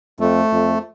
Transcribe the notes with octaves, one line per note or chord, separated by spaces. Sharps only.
F2 A3
F2